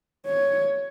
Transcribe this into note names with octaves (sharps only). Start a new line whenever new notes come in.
C#5